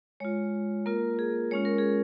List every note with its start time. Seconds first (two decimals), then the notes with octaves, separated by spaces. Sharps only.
0.20 G#3 F4 C#5
0.86 A#3 F4 A#4
1.19 G#4
1.51 G#3 C#4 F4 C#5
1.65 A#4
1.78 G#4